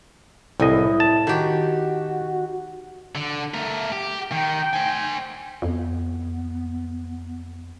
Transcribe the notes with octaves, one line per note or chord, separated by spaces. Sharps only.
C2 A2 E4 D#5
A5
D#3 F#4 G4
D3
A3 A#4
G4
D#3 G5
C5 G#5
F2 B3